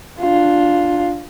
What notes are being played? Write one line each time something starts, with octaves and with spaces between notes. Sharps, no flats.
D4 F4